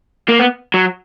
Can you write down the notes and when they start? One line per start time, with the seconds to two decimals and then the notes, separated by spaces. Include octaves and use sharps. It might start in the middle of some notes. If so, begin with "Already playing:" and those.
0.29 A#3
0.40 B3
0.74 F#3